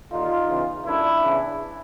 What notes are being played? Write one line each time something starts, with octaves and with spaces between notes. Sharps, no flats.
D#2 D3 D#4 F4
E2 C#3 E3
F#2 D3 D4 E4
E2 C#3 E3